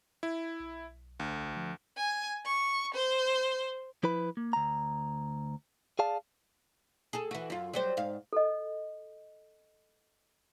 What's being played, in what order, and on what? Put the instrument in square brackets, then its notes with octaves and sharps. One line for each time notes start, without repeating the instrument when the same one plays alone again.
[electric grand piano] E4
[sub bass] B1
[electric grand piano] D2
[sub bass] F3
[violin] G#5
C#6
C5
[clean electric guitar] F3 E4 B4 B5
A#3
D2 A#5
G#4 D5 F5 A5
[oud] G#4 A4
E3 F#4
F#2 F4
F#3 G3 C5
G#2 F5
[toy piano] A4 D#5